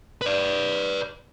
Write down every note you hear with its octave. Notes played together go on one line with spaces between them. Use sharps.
B4 D5